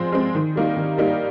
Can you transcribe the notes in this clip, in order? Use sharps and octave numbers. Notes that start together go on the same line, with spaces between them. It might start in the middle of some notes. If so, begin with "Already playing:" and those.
Already playing: F3 G#3 C4
G#3 C4
D#3
G3 A#3 D#4
D#3
G3 A#3 D#4